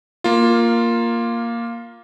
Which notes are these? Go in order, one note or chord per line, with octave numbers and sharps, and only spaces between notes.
A#3 F4